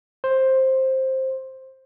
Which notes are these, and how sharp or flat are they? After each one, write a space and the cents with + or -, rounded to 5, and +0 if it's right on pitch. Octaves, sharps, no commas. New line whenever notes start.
C5 +10